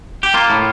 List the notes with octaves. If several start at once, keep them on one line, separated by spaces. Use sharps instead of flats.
G4
A#3 F4
A2